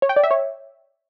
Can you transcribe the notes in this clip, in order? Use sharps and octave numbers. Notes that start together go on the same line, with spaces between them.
C#5
G5
D5
E5
C#5